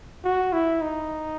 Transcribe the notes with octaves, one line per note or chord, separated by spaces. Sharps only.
F#4
E4
D#4